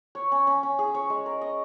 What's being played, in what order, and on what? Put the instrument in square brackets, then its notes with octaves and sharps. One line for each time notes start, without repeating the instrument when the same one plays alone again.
[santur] C#5
C#4
C#4
C#4
G#4
C#5
G#3
A#4
D#5